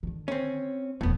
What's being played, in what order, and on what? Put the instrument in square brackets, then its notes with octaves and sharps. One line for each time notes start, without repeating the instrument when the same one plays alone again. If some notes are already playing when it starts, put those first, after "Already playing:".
[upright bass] D3 D#3
[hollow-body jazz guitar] C4 C#4
[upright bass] D#1 F2 [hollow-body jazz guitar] A2 B3